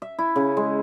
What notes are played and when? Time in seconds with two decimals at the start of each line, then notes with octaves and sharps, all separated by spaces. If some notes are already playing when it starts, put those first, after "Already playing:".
0.02 E5
0.19 E4
0.36 C#3
0.57 G#3